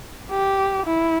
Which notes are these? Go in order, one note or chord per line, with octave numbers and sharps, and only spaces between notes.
G4
E4